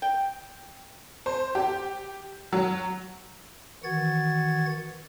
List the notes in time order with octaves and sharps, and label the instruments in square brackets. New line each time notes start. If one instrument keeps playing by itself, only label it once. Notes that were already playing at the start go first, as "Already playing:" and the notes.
[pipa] G5
[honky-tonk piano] C5
G4
F#3
[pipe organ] D#3 E3 F#4 F#5 G#6 A6